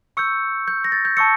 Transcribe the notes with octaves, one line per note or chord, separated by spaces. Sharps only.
C#6 E6 G6 C#7
G6
A#6
A6
G6
A5 C#6 E6 C#7